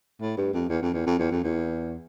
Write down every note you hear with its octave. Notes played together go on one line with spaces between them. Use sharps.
A2
G2
F2
E2
F2
E2
F2
E2
F2
E2